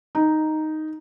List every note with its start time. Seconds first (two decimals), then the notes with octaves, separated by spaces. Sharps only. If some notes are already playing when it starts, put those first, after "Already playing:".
0.15 D#4